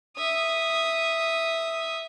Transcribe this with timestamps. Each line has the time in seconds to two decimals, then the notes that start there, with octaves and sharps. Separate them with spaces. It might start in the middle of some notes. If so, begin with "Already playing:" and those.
0.17 E5 D#6